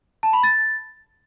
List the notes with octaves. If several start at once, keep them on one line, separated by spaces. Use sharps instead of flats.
A5
B5
A6